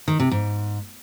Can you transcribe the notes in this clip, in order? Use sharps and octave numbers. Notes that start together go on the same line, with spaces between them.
D#3
C3
G#2